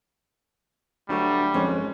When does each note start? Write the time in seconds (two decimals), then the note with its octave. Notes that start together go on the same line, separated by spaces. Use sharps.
1.09 D2 F#3 G3 A3 F#4
1.54 G#1 F2 G#3 C#4